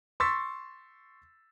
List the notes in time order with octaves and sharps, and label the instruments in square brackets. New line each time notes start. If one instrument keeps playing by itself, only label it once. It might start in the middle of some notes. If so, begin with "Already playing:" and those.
[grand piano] C6 C#6 E6 A6 B6